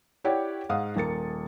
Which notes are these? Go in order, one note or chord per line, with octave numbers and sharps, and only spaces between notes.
E4 G4 C#5 D5 F#5 G5
G#2 F5 F#5 D#6
D#1 A#3 A6 C#7